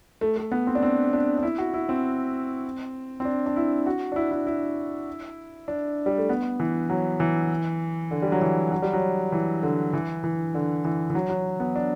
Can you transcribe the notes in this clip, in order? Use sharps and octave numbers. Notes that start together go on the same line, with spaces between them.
A3
A3
B3
C4
D4
C4
D4
D4
E4
F#4
E4
C4
C4
D4
D4
E4
F#4
D4
E4
E4
E4
D4
G3
A3
B3
E3
F#3
E3
D3
G3
F#3
E3
F#3
G3
F#3
E3
D3
E3
E3
D3
E3
E3
F#3
F#3
B3
D4